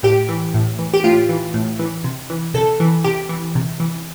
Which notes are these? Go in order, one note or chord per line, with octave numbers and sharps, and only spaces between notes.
A2 G4
E3
A2
E3
G4
A2 F4
E3
A2
E3
C3
E3
C3 A4
E3
C3 G4
E3
C3
E3